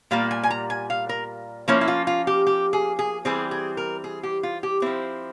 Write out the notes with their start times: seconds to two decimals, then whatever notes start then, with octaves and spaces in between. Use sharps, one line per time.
0.11 A#2 G3 A#3 F5
0.31 G#5
0.43 G#5
0.50 A#5
0.70 G#5
0.90 F5
1.09 A#4
1.68 F3 A#3 C#4 E4
1.81 E4
1.88 F4
2.07 F4
2.27 G4
2.47 G4
2.73 G#4
2.99 G#4
3.25 E3 G3 C4 G#4
3.51 G#4
3.77 A#4
4.04 G#4
4.23 G4
4.43 F4
4.63 G4
4.82 F3 C4 E4